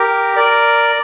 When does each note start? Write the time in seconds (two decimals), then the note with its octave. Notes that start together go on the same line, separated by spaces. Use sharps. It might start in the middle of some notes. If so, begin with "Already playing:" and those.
Already playing: G4 A#4
0.36 A#4 D5